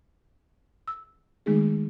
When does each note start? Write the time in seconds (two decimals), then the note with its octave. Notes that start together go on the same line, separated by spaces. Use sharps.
0.88 E6
1.46 D#3 G#3 A3 B3 D#4 G#4